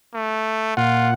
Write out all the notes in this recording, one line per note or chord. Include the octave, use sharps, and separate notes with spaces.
A3
A#2 F4 F#5